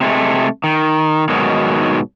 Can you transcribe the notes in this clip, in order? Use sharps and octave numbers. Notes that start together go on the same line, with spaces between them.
C3 G#3 A3
D#3
G#2 B2 D#3 F#3